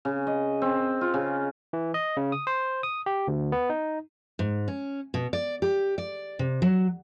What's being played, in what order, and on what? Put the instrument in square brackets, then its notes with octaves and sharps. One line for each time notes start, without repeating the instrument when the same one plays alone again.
[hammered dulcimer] C#3
D#5
C4
F4
C#3
[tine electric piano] E3
D#5
C#3
D#6
C5
D#6
G4
D2
B3
D#4
[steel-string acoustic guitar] G#2
C#4
B2
D5
G4
D5
C3
F#3